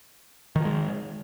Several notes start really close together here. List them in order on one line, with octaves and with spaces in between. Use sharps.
D#3 F3 G#3